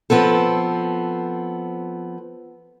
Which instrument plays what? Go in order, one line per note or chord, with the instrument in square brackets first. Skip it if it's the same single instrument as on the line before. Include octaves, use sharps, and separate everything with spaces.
[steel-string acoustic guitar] F3 B3 C4 A4